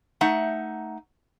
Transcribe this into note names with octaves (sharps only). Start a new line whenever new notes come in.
A3 D#4 E5 F#5